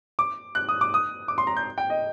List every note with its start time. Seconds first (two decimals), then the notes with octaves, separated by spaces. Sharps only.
0.19 D6
0.55 F#6
0.69 D#6
0.81 D6
0.94 D#6
1.28 D6
1.38 C6
1.47 A#5
1.57 G6
1.78 G5
1.90 D#5